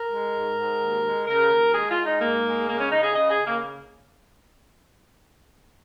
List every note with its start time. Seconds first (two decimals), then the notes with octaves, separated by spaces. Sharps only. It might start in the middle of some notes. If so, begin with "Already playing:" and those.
Already playing: A#4
0.10 G#3
0.34 G#2
0.57 G#2
0.81 D#2
1.04 G#3
1.27 C#3 A#4
1.51 D#2
1.74 G#3 G#4
1.90 F4
1.98 G#3
2.05 D#4
2.21 G#2 A#3
2.45 G#3
2.68 C#3 A#3
2.80 C#4
2.92 C#3 D#4
3.03 G#4
3.15 C#3 D#5
3.31 G#4
3.38 C#3
3.46 A#3